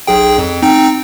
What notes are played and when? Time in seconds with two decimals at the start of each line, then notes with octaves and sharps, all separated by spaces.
0.07 B1 G#4 G5
0.38 F2
0.62 C4 D#4 G5